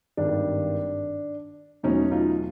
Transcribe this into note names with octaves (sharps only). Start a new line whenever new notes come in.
G#1 G2 D#3 D4
E2 B2 F#3 A3 C#4 D#4
D#4 F4